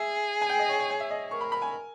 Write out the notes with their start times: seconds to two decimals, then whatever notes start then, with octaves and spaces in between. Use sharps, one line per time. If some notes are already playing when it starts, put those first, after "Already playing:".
Already playing: G#4 E5
0.42 G#5
0.49 G5
0.59 D#5
0.69 C#5
0.79 C#5
0.90 C#5
1.00 E5
1.11 D#5
1.31 A#4 C#6
1.41 B5
1.52 B5
1.62 G#5